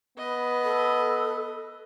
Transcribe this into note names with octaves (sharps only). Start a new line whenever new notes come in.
B3 B4 D#5
A4